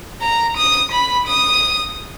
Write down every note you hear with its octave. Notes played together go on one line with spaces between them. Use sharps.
A#5
D#6
B5
D#6